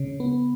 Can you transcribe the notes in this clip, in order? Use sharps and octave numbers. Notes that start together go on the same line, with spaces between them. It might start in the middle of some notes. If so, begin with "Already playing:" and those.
Already playing: C#3
B3